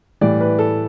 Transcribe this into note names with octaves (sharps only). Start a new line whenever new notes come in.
A2 E3 G3 D5
B4
A4